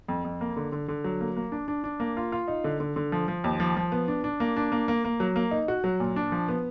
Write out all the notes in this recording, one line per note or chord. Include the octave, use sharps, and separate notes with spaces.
F2
F2
A#3
D3
D3
D3
F#3
A#3
A#3
D4
D4
D4
A#3
F4
F4
D#4
D3
D3
D3
F3
F3
D#2
F3
F3
B3
D4
D4
A#3
D4
A#3
A#3
A#3
F#3
A#3
D#4
F#4
F#3
A#2
D4
F3
B3